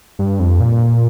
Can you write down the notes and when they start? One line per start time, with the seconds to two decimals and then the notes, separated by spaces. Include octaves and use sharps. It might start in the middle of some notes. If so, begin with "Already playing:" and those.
0.19 G2
0.40 F2
0.60 A#2